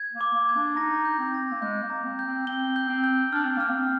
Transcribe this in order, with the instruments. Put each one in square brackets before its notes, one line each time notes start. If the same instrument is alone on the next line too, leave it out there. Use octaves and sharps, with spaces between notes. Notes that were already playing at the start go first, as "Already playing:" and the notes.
Already playing: [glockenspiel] G#6
[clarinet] A#3
[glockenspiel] D6
[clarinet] A#3
[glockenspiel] G#6
[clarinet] D4
[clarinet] D#4 [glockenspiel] A#6
[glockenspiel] G6
[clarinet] C4
[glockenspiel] A#6
[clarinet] A#3
[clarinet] G#3 [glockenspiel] G6
[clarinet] A#3
[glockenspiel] A#5
[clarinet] C4
[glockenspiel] G6
[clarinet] C4
[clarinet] C4 [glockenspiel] G7
[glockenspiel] G6
[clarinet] C4
[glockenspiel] G6
[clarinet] D4 [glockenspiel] F6
[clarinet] C4
[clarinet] A#3 [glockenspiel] F6
[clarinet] C4